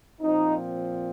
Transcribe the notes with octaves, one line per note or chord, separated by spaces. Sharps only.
A#2 F3 C4 D#4